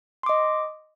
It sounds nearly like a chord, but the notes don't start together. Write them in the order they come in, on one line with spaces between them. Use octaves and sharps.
C6 D6 D#5